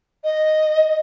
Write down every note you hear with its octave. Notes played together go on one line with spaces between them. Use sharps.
D#5